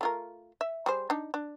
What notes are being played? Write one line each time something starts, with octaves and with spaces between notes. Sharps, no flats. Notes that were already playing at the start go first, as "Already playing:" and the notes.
A3 F4 A#4
E5
G3 G#4 C5
D4 D#4
D4